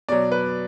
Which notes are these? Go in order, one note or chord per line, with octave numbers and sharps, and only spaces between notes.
B2 F#3 D5
B4